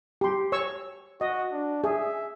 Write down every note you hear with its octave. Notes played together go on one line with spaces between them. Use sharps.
G4 C6
C#5 C#6 E6
F#4 D#5
D4
G#4 E5